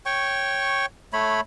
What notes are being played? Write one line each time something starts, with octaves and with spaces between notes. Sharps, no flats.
C#5 G5 C#6
A3 C#5 B5